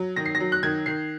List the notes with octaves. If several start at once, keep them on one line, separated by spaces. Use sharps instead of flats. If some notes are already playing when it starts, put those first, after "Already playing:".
Already playing: F#3
D#3 A#6
C7
A#6
F#3
F#6
D#3 G#6
D#3 C7